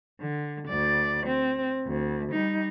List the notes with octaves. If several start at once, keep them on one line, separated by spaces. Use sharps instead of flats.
D3
D2 D5
C4
D2
G3 D#4